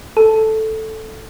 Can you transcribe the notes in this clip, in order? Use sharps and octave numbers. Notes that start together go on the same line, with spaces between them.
A4